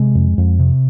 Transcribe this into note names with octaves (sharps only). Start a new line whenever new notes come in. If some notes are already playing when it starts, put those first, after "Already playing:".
Already playing: C3 G#3
F2
F2
C3